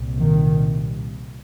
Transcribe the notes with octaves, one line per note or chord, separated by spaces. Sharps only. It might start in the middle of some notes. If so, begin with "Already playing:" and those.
Already playing: C2 A#2
D#3